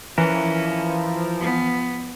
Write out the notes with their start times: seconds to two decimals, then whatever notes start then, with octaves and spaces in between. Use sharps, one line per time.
0.18 E3 F3 C#4 E4 A#4
1.40 B3